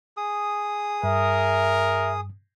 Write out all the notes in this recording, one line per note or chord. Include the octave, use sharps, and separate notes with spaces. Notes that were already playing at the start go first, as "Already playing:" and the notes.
G#4 D#6
G2 A#4 E5